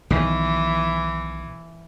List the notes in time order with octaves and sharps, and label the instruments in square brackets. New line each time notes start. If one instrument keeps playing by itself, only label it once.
[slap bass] B1 D#3 [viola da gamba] E3